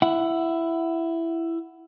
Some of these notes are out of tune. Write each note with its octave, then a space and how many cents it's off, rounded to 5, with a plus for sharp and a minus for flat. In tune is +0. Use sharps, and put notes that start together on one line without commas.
E4 +10 F#5 +0